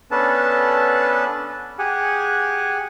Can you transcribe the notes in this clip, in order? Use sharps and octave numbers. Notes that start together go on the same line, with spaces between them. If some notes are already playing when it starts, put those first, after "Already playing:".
B3 C#4 D4 A4 B4 A5
G4 G#4 F#5 G#5